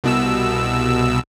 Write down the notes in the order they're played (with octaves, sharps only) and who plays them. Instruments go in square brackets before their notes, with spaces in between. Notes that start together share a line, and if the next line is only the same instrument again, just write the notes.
[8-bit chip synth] C2 B2 E6